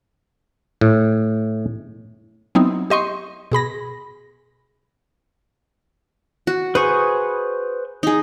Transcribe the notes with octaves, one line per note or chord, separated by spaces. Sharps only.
A2
F#3 B3 C4 D#4 E4
G4 D#5 C6 C#6
B2 G#4 B5 A#6
F#4
G#4 B4 C5 C#6
D#4 G#4